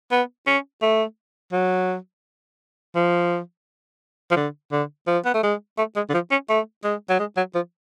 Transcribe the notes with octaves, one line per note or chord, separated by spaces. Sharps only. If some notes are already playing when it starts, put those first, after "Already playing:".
B3
C#4
A3
F#3
F3
F3
D3
D3
F3
B3
A3
G#3
A3
G#3
D3
F3
C#4
A3
G#3
F#3
G#3
F#3
F3